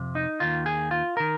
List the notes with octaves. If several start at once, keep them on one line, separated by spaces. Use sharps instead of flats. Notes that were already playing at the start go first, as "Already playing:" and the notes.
Already playing: F2 C3
D#4
D#2 D#3 F4
G#4
F4
D#3 A#4